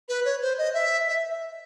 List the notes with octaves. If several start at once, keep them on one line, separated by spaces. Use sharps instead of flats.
B4
C#5
C5
D#5
E5
E5